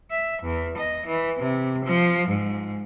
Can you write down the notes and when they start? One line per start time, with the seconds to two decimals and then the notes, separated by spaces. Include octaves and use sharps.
0.10 E5
0.43 E2
0.78 D#5
1.07 E3
1.38 C3
1.85 F3
2.28 G#2